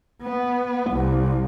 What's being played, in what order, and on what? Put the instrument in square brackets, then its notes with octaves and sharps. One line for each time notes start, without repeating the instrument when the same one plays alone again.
[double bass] B3
C2